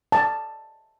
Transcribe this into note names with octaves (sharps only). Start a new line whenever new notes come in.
A5